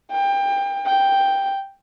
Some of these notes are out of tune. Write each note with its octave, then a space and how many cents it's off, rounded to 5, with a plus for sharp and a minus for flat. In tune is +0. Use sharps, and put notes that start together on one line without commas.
G5 +25
G5 +5